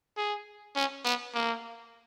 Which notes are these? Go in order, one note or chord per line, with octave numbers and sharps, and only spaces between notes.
G#4
C#4
B3
A#3